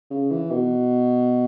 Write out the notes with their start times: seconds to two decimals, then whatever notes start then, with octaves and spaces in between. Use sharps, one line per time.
0.10 C#3
0.31 E3
0.51 B2